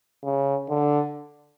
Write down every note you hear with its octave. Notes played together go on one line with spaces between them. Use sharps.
C#3
D3